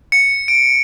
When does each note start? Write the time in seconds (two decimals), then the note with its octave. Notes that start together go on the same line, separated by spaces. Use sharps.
0.12 C#7
0.48 D7